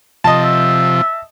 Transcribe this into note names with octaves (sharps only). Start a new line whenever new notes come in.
C3 F3 D#5 A5
E5